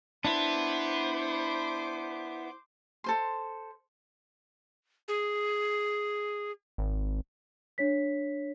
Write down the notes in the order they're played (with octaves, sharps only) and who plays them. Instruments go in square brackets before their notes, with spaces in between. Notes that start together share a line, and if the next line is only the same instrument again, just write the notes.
[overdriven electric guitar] B3 B4 [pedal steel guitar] D4 E4 [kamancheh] C5 D6
[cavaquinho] A4 C5 C6
[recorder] G#4
[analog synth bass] G#1
[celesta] D4 C#5 B6